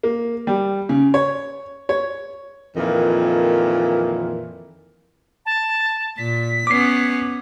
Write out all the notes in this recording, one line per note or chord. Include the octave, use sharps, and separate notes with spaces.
A#3
G3
C#3
C#5
C#5
F2 A#2 D#3 E3
A5
A#2 B6
B3 C#4 D6 C7